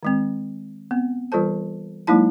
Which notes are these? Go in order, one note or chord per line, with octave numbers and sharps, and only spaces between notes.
D#3 G#3 C4
B3 C4
E3 G3 F4 A4 C5 A5
F#3 G#3 A#3 D#4 E4 A5